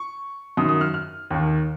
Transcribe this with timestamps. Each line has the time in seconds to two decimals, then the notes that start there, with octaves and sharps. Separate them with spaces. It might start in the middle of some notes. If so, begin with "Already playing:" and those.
Already playing: C#6
0.57 F#2 D#3 D#6
0.69 D#6
0.81 F6
0.94 F6
1.31 D#2 D#3